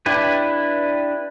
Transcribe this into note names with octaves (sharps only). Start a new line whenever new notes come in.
D4 E4 G4 B4